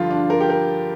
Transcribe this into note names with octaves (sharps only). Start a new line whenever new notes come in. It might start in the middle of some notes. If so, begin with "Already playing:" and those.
Already playing: G2 D3 F3 F4
D4
A#4
G4
A#4